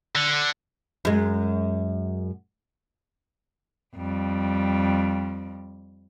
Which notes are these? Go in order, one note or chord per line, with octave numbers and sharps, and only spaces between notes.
D3
F#2 G#3
F2 G3